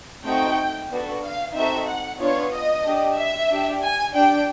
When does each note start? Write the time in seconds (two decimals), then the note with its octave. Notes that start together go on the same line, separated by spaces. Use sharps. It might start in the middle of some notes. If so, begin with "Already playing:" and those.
0.24 A3 C4 D#4 F#4 G5
0.89 B3 D4 F#4 A4
1.21 F5
1.54 C4 D#4 F#4 A4 E5
1.86 F#5
2.20 B3 D4 F4 C#5
2.52 D#5
2.83 D4 G4
3.16 E5
3.49 D4 G4
3.82 G#5
4.13 D4 G4 G5